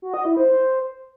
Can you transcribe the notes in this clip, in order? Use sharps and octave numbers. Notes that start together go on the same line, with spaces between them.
F#4
D#5
E4
C5